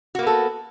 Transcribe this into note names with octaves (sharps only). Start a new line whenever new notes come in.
A#3 B3 F#4 A4